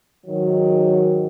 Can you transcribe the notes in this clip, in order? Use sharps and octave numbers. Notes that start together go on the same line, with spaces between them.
G#2 D#3 F#3